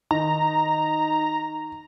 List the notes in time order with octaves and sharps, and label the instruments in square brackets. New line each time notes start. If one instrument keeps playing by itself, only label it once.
[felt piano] D#3 [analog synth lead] D#4 [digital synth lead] A#5